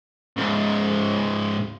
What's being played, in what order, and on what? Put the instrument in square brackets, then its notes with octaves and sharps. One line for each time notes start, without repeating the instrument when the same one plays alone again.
[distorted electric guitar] C#2 G#2